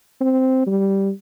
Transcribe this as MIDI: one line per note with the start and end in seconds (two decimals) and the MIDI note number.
0.21 0.65 60
0.66 1.10 55